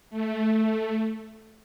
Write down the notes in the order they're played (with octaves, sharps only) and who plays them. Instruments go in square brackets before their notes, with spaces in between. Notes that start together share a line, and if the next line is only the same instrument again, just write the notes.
[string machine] A3
A3